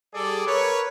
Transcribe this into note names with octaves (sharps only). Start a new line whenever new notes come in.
G3 G#4 A4 D5
A#4 B4 C#5